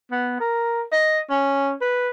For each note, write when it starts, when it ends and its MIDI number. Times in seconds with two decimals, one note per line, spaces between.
0.11 0.37 59
0.40 0.82 70
0.92 1.19 75
1.30 1.72 61
1.81 2.10 71